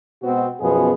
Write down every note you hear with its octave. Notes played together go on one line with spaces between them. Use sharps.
B2 G#3 B3 C4 F#4
F#2 B2 F3 B3 G#4